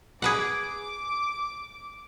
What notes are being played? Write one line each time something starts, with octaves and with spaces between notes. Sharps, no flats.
G#4 B4 F#5 D6